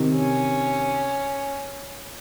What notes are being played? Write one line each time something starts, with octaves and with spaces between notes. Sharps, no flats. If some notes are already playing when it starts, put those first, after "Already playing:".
Already playing: C3 D#3
C#4